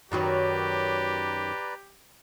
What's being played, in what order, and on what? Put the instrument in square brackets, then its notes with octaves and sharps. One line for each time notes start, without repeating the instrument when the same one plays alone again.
[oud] F#2 D#3 F#3 [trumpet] G4 [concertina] B4 D5 A#5